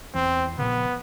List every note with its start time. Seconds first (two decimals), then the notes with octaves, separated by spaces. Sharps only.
0.14 E2 C4
0.58 A#1 A#2 C#3 B3